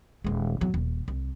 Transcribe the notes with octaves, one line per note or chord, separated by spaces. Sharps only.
D#1 G#3
E2 F#3
D#1
C2